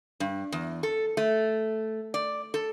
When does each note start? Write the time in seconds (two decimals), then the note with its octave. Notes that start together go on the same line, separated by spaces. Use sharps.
0.20 G2
0.52 E2
0.83 A4
1.17 A3
2.14 D5
2.54 A4